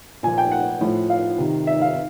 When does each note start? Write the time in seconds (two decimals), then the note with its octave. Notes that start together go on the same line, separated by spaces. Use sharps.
0.23 A#2 F3 G#5
0.38 G5
0.52 F#5
0.81 A2 F3
1.10 F5
1.38 C3 D#3
1.67 E5
1.82 F5